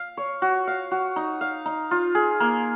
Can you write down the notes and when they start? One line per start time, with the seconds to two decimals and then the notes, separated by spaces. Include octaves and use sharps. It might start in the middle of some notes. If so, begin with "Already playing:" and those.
Already playing: F5
0.17 C#5
0.42 F#4
0.67 F5
0.91 F#4
1.16 D#4
1.41 F5
1.66 D#4
1.91 F4
2.15 G#4
2.40 A#3